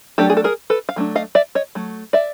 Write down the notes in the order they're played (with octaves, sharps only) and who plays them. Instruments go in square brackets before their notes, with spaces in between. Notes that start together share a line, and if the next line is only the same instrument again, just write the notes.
[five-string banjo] F#3 A3 D4 G4 A4
G#4
A4
G#4 A#4
A4 B4
F5
F#3 A3 D4
D#5 F5
D5 E5
C#5 D#5
F#3 A3
D5 E5